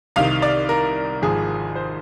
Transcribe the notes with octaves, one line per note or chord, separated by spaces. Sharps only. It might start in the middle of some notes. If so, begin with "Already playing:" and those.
C2 C3 D#3 F5
D5
A#4
G#1 G#2 F3 G#4
C5